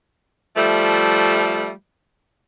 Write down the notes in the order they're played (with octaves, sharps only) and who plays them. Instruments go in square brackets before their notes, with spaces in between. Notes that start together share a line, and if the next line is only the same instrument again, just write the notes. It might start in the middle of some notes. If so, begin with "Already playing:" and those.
[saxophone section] F3 G3 A3